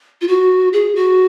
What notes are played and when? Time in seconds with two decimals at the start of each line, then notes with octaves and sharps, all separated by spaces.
0.21 F4
0.28 F#4
0.73 G#4
0.95 F#4